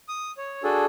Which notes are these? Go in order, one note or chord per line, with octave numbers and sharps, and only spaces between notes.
D#6
C#5
D4 F#4 G#4 A4